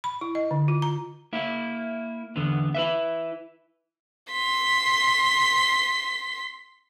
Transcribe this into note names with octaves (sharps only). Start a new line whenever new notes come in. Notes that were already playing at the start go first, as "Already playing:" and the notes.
B5
E4
D#5
D3
F4
A#5
A#3 E4
E2 D3 B3
E4 B4 E5
C6 B6